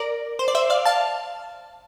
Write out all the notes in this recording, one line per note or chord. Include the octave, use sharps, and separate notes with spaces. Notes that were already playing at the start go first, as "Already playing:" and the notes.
Already playing: A#4 D5
C5
D5
C5 E5
D5 F5
F5 A5